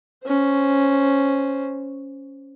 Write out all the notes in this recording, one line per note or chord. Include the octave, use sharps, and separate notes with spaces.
C#4 C5